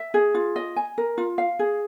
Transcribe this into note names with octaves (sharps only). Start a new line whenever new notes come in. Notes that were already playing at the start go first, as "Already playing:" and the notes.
Already playing: E5
G#4
F4
D#5
G#5
A#4
F4
F5
G#4